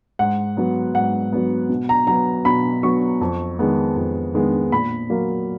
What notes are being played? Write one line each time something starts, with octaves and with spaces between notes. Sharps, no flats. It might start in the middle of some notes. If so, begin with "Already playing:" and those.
G#2 F#5
F#3 B3
G#2 F#5
F#3 B3
B2
A#5
F#3 B3 A#5
B2 B5
F#3 B3 C#6
F2
D#3 G#3 B3
F2
D#3 G#3 B3
A#2 B5
F#3 A#3